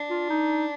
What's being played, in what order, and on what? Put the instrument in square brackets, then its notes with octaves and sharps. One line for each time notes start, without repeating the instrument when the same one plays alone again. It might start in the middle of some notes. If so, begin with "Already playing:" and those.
Already playing: [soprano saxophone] D4
[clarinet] F4
D#4